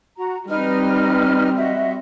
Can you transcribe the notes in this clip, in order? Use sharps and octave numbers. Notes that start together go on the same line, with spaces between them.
F#4 A#5
G3 C4 D#4 B4 F6
F#4 D#5 E5